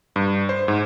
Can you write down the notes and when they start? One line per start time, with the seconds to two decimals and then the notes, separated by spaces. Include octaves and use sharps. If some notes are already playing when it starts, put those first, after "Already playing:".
0.16 G2
0.49 C5
0.68 G#2